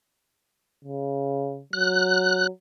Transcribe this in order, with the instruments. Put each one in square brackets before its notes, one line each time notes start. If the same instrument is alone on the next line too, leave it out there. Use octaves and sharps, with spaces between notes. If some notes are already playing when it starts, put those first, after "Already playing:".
[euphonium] C#3
[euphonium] F#3 [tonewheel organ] F#6